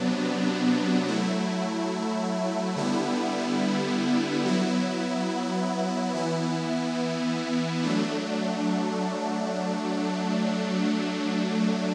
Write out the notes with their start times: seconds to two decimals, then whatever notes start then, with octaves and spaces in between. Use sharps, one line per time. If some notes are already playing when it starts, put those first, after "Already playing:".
Already playing: C3 F#3 B3 D4
1.06 F#3 A3 E4
2.76 D3 G3 B3 E4
4.46 F#3 B3 E4
6.14 E3 B3 E4
7.83 F#3 A3 D4